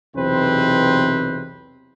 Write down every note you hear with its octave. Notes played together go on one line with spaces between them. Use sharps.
B1 E2 C3 C4 B4 C5